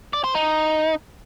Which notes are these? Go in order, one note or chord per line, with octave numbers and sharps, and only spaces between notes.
D5
C5
D#4